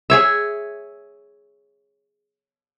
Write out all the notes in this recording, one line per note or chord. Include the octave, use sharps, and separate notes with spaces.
G#4 C#5 E5